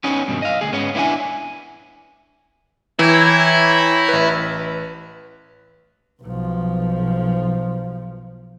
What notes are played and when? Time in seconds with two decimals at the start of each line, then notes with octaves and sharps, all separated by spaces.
0.04 B3 C#4 D#4 G#4 C#5 B5
0.28 G2 B2 D#3
0.42 D#5 F5
0.61 D2 G#4
0.72 G#2 B3 C#4
0.95 B3 D4 E4 C5 G#5
2.99 E3 E4 C#5 G5 A#5
4.09 A1 B4
6.23 B1 F3